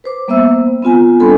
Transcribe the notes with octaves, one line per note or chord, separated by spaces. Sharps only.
B4 C5 D6
G3 A#3 B3 C5 E5 E6
B3 C4 F4 G#5
G3 C4 D4 A4 G#5 B5